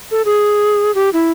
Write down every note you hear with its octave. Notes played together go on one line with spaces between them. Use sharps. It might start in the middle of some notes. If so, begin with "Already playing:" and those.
A4
G#4
G4
E4